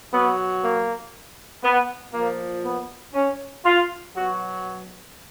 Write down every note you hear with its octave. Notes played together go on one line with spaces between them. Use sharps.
B2 F#3 B3
A#3
B3
A#2 F3 A#3
B3
C#4
F4
B2 F#3 F#4